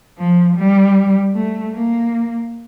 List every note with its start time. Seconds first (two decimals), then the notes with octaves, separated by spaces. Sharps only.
0.18 F3
0.57 G3
1.34 A3
1.74 A#3